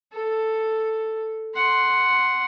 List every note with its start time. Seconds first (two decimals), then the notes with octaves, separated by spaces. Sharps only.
0.13 A4
1.55 F#5 C6